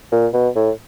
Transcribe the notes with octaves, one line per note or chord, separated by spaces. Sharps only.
A#2
B2
A2